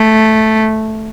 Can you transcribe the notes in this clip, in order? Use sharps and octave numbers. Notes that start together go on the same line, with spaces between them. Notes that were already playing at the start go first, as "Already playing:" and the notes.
Already playing: A3